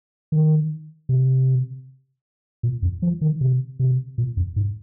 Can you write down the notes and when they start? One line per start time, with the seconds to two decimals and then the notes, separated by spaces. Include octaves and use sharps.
0.32 D#3
1.09 C3
2.63 A#2
2.82 F2
3.02 F3
3.21 D#3
3.41 C3
3.79 C3
4.18 A#2
4.37 F2
4.56 G#2